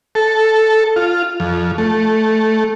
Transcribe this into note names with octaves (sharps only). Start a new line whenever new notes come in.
A4
F4
F2
A3